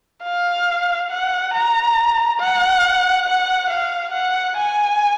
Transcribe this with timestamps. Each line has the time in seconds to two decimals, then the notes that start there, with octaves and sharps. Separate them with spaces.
0.23 F5
1.10 F#5
1.54 A#5
2.40 F#5
3.27 F#5
3.70 F5
4.13 F#5
4.57 G#5